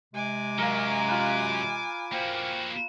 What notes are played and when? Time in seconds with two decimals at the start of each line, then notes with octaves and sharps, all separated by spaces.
0.14 C3 G#3 G#5 D6
0.58 F#2 F#3 A#4 F5
1.08 F4 B4
2.12 A#3 F#4 C5 F5 G5